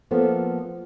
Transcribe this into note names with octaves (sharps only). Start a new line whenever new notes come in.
F3 A#3 B3 A4